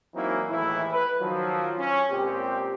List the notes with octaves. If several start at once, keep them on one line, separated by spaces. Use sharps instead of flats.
E3 F#3 A#3 C4 D#4 E4
D#2 A2 E3 G#3 E4
B4
D#3 F3 F#3
C#4
C#2 A#2 C4 G4